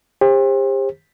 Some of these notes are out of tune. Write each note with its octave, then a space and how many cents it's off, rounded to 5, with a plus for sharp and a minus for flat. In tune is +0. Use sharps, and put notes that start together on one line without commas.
G4 +40 C5 +30